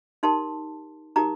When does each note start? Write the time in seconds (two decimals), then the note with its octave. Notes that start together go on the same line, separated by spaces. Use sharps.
0.23 D#4 G4 A#4 A5 C6
1.16 D#4 G4 A#4 A#5 D6